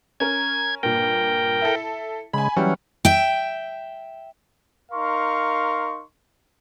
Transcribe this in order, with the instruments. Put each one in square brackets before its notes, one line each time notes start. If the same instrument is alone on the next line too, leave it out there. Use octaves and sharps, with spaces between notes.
[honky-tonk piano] C#4 A#4 [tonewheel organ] G#6
[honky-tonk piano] G2 A#2 [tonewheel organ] A#4 G5
[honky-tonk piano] E4 A4
[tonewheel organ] C#3 G#3 [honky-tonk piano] G#5 B5
[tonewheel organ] E3 F#3 C#4 [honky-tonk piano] G3
[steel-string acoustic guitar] E5 G5
[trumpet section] D#4 A#4 F5 C6 C#6